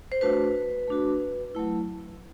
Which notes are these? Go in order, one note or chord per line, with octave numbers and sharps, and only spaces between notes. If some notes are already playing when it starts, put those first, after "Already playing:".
C5
A3 D4 F#4 B4
A3 D4 F#4
F#3 A3 E4